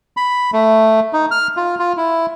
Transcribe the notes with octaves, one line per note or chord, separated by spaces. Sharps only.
B5
A3
D#4
F6
F4
F4
E4